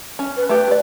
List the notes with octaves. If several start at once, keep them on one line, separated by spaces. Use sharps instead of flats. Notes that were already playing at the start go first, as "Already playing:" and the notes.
C#4
B4
A3 G4 B4
A#4 D5